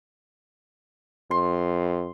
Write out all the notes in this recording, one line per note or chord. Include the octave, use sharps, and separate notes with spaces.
F2 C6